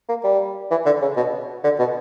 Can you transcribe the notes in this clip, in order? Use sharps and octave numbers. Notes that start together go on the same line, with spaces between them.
A#3
G3
E3
D3
C#3
B2
D3
B2